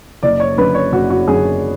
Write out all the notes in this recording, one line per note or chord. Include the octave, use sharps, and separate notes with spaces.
F#1 D5
C#5
F#2 D3 B4
C#5
F#1 F#4
F#4
F#2 D3 G#4